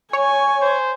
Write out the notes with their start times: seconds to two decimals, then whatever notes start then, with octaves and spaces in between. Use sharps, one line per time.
0.13 C#5 G#5 C#6
0.62 C5